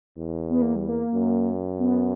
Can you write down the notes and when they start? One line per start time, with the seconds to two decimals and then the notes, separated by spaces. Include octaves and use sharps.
0.17 E2
0.49 B3
0.62 A#3
0.76 G3
0.89 A#3
1.14 F#2
1.78 B3